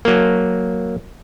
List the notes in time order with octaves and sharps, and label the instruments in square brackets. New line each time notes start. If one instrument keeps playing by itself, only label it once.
[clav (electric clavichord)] F#3 A#3